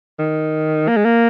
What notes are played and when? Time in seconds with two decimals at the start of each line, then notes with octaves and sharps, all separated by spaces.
0.19 D#3
0.88 A#3
0.97 G#3
1.05 A#3